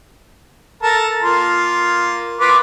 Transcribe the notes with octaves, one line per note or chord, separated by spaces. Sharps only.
A4 A#4 A5
A#3 F4
F4 B4 D6